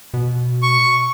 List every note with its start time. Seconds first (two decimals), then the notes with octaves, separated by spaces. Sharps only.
0.14 B2
0.63 C#6